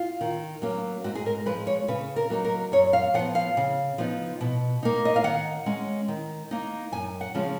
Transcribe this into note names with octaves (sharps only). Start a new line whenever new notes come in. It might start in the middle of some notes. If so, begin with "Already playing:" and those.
Already playing: F4
D#3
F#3 A#3 C#4
G#2 F#4
G#4
A#4
F3 G#3 B4
C#5
C#3 B4
A#4
F#3 A#3 D#4
A#4
F#2 C#5
F5
F3 F#5
B3
F5
C#3
F3 B3 D#4
B2
A#3 D#4
D#5
F5
D#3 F#5
G#3 C#4
D#3
A#3 D#4
F#2 G#5
F#5
C#3 F3 G#3 C#4